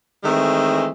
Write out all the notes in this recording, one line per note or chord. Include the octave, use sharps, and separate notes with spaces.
D#3 E3 G#3 A3 C4